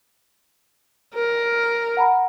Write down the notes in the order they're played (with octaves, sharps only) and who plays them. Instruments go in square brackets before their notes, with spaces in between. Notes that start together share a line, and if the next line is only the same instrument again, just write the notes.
[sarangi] A#4
[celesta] F#5 A#5 B5